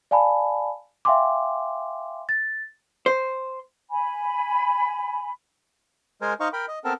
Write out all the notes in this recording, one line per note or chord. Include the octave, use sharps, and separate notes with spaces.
D5 F5 G#5 A5 B5
E5 F5 G5 G#5 C6 D6
A6
C5
G#5 B5
G#3 A#4 C5 G#5
D#4 C5 D#5 F5 C#6
A#4 G5 B5
D#5
B3 C4 A4 A#4